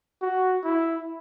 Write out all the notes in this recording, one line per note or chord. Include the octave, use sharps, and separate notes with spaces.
F#4
E4